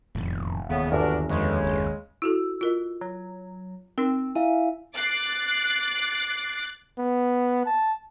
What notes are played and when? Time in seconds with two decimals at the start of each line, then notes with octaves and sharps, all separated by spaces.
0.15 E1 F2 A2 D#3
0.70 D#2 A2 C#3 B3
0.92 G1 E2 D4 F#4 A#4
1.29 F2 C#3 G#3
1.64 F#1
2.22 E4 F#4 A4 E6
2.61 F4 A#4 D#5
3.01 F#3
3.98 C4 D#4 A#4
4.35 E4 E5 F5 G#5
4.94 D6 F#6 A6 C7
6.98 B3
7.66 A5